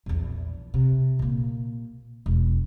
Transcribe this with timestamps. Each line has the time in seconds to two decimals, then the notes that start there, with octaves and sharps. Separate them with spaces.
0.06 A#1 E2
0.74 C3
1.19 A#2 A#3
2.26 E1